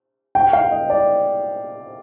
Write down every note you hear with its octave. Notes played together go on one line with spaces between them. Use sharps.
G5
F5
D#5
D5